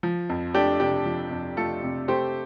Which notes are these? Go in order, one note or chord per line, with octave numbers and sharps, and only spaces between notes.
F3
F2
A3 D4 G4
C3 D4 G4
F3
F2
A3 F4 A4
C3
A3 G4 C5